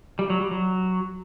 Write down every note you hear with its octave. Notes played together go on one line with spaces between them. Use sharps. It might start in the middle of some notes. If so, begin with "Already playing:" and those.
G3
F#3
G3
F#3